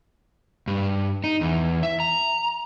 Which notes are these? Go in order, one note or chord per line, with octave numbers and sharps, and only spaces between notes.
G2
D#4
E2
E5
A#5